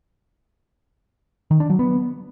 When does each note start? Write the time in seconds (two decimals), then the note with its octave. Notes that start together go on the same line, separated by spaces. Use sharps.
1.51 D#3
1.60 D4
1.70 F#3
1.79 B3